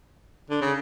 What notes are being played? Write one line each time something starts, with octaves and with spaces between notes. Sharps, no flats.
D3
C#3